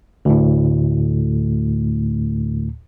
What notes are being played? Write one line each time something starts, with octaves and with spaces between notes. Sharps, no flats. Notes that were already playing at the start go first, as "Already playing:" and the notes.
D2 A2